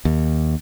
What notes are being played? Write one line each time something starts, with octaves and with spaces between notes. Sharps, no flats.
D#2